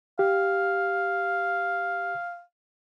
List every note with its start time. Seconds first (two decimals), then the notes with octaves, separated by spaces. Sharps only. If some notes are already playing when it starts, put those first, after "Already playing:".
0.19 G4 F5